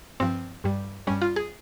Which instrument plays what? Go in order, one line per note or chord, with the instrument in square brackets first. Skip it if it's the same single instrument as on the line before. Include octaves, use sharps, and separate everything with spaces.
[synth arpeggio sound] G2 F3 C4
G2 G3
G2 G3 C#4
F4
G#4